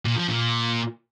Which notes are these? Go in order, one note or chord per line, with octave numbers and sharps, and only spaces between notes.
A#2
F3
A#2